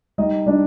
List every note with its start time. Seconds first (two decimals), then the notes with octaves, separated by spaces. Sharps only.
0.18 G3 D#4 D#5
0.46 G3 D4 D5